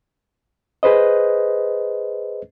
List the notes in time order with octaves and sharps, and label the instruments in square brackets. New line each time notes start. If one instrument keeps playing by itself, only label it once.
[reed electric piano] G#4 B4 C5 D#5